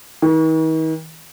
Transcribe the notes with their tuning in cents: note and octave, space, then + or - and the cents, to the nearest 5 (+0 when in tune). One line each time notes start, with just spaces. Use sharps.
D#3 +45